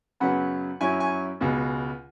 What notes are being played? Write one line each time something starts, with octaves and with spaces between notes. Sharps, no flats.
F#2 C#3 F#3 B3 F#5 B5
F#2 F#3 C#4 E4 G#5 C#6
G#5 C#6
C#2 B2 G#3